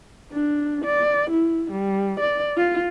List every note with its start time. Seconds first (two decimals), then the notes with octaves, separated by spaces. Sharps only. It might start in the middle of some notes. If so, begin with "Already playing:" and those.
0.32 D4
0.85 D5
1.30 E4
1.71 G3
2.20 D5
2.57 F4